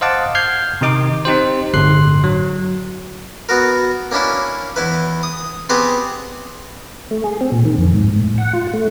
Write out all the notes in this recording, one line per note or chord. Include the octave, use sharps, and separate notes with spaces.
C5 D#5 F5 F#5 A5 D6
F6 G6 G#6 C7
C3 D#3 D#4 D6
C4 D#4 G4 C5
G1 A2 D3 C6 F#6 C7
F#3
B3 F#4 A#4
A#3 C#4 D4 E4
E2 E4 B4
D#6
B3 C4 G4 G#4 C5 F#5
A3
G#4
C4
A#2
D#3
F2
G#2
A2
F#5
F4
A3